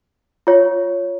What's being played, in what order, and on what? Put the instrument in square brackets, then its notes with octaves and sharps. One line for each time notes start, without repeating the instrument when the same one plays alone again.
[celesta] F4 C#5